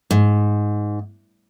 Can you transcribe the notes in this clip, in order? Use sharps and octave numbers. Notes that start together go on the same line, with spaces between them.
G#2